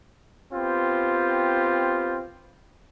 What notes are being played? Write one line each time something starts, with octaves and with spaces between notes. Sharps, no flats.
B3 C4 F4 G4